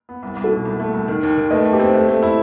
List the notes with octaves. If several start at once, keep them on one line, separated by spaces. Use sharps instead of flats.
B3
C2
C2
F#4 A4
B2
C2
A3
C2
D#3
D#2
D#3
A3 B4 D#5
A3
G4 B4
C4
A3
A3
E4